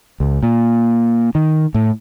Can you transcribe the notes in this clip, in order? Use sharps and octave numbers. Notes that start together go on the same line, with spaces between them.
C#2
A#2
D#3
A2